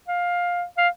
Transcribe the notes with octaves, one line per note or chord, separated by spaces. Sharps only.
F5
F5